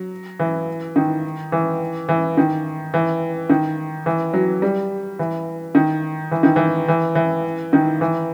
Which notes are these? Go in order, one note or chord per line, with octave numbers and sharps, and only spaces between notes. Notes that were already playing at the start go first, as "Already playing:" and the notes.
Already playing: F#3
E3
D#3
E3
E3
D#3
E3
D#3
E3
F#3
G3
E3
D#3
E3
D#3
E3
E3
E3
D#3
E3